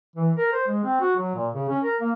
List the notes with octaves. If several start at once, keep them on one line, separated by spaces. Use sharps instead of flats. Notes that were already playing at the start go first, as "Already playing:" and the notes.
E3
A#4
C5
G#3
C4
F#4
F#3
A#2
C#3
C#4
A#4
A#3